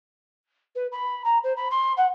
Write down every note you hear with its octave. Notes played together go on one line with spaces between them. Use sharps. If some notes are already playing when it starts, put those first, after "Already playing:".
B4
B5
A#5
C5
B5
C6
F#5